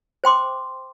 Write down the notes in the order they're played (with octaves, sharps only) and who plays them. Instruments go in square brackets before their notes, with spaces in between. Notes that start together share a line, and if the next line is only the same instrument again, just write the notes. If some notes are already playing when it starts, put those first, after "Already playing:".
[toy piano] C5 G5 C6 D6